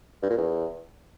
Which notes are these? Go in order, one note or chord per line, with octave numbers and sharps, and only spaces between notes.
G2
A#2
E2